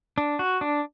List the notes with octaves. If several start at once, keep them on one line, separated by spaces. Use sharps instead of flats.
D4
F#4
D4